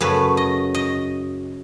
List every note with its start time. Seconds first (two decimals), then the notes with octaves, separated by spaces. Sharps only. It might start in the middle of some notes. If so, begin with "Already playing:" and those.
0.01 F#2 C#3 F#3 A3 B4
0.37 D#5
0.75 D#5